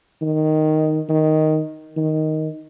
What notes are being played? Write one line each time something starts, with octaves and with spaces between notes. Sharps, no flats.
D#3
D#3
D#3